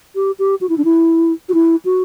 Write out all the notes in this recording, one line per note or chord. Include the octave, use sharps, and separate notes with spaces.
G4
G4
F#4
E4
D4
E4
F#4
E4
F#4